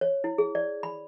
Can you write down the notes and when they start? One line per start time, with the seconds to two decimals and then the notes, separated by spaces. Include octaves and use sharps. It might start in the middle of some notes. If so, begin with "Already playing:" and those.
0.01 C#5
0.24 E4
0.38 G#4
0.55 D5
0.83 B5